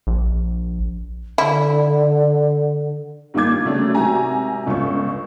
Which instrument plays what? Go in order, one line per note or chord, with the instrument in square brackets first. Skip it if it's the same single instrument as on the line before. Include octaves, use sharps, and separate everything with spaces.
[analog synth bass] A#1
[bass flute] D3 [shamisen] E4
[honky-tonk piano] G2 D#3 A#3 F4 D6 G#6
C#3 F#3 A3 C#4 D4
G#1 C3 F#4 G#5 A#5
G1 C#2 C#4 F4 C#6